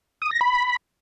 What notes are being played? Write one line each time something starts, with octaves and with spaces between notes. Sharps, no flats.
D#6
A#6
B5